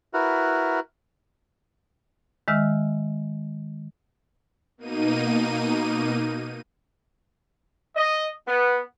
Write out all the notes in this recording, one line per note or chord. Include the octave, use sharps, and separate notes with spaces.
E4 F#4 A#4 B4
D#3 G#3 E5 E6 F6
B2 A#3 D#4 D#7
D#5
B3